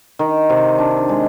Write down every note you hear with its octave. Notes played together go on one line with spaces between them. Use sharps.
D#3
C3
D4
G#3